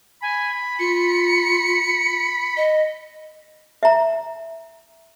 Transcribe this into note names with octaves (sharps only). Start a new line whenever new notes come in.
G#5 B5
F4 C#7
D#5
E5 A#5